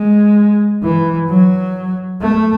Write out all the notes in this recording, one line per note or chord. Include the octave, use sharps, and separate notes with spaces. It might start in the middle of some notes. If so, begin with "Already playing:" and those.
Already playing: G#3
E3
F#3
A3